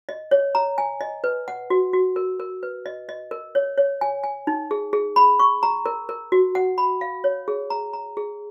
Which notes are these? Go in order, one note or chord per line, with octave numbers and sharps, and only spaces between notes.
D#5
C#5
A#5
G#5
D#5
B4
F#5
F#4
F#4
A#4
A#4
B4
D#5
D#5
A#4
C#5
C#5
G#5
G#5
D#4
G#4
G#4
B5
C#6
A#5
A#4
A#4
F#4
F#5
B5
F5
C#5
G#4
A#5
A#5
G#4